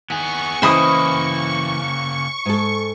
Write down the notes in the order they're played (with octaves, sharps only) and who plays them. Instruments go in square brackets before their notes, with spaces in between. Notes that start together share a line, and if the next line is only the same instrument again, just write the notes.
[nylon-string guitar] D#3 [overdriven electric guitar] B3 G#4 [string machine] C#6
[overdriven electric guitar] C#3 A#3 [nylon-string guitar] E3 C#4 D#5 [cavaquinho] C5 B5 D#6
[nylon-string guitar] G#2 A4